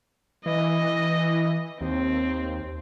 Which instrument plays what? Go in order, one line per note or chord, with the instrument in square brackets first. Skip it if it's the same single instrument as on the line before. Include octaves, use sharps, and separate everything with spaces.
[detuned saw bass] E3 [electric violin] D#5
[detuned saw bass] D#2 [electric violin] C4